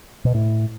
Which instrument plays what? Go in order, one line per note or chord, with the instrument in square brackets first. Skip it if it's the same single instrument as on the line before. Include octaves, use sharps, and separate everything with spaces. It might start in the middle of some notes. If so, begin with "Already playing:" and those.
[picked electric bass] B2
A2